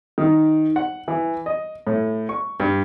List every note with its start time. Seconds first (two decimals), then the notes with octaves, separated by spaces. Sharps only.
0.18 D#3
0.76 F#5
1.08 E3
1.46 D#5
1.87 A2
2.29 C#6
2.60 G2